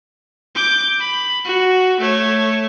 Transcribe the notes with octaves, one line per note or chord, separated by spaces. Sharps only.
D6 G6
B5
F#4
A3 C#5